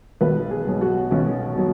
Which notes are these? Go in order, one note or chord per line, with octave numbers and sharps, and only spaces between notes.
B1 B4
G#4
B2 F#3
F#4
B1 C#4
B2 F#3